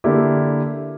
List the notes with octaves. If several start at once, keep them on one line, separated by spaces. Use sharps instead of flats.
D3 A#3 E4 G4